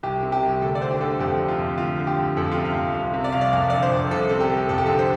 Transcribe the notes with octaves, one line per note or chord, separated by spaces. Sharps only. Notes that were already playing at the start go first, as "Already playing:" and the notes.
C2 G4
C3
G4
C2
D2 A4
D5
D3 C5
G4
D2 A4
F2 G4
C3
F4
F2
D2 F4
D3
G4
D2
F2 A4
G4
F4
C3
F5
F2
C2 F5
C3
D5
C2 F5
D5
F2 F5
D3 D5
C5
F2
C2 A4
C3 A4
G4
C2
F2 A4
G4
D3 A4
C5